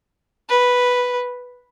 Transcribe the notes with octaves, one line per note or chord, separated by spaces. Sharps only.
B4